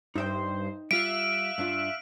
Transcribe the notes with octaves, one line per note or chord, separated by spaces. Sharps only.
G2 D#4 C5 E5 G5
G3 F4 E5 F5 F#6 D7
G2 D4 F4